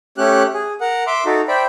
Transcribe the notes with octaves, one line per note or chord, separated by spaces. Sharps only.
A3 C#4 G4 F#6
G#4
A#4 F#5
E5 C6 D6
D#4 F#4 A4
C5 D5 E5 G5 B5